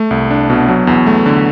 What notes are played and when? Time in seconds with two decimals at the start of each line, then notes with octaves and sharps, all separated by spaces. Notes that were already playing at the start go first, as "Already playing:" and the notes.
Already playing: A3
0.11 C2
0.30 D4
0.50 B2
0.68 F#3
0.87 E2
1.07 A3
1.26 D3